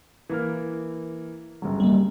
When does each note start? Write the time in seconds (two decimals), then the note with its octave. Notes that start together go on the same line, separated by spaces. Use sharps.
0.30 E3 A#3 F6
1.62 G1 C#3 F#3
1.80 G3 A#3